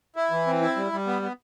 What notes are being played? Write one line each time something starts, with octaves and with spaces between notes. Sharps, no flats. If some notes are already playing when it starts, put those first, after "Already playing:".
E4
E3
C4
E4
G3
G3
B3
B3